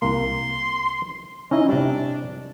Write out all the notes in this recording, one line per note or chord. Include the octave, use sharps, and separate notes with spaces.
C2 A#3 C6
C#4 D#4 E4 D#5
C3 G3 D4